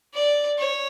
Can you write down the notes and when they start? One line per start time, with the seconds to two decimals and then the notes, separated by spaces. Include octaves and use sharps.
0.14 D5
0.59 C#5